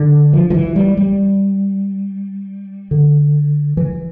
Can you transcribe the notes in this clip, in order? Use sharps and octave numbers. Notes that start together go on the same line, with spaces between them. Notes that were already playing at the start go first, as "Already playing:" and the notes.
Already playing: D3
F3
F3
E3
G3
G3
D3
E3